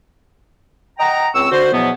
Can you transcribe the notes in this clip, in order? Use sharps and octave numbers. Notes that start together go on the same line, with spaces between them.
D#5 F#5 G5 A#5
C#2 C4 C#6 E6
D3 F#4 C5
E2 B2 F3 F#3 B3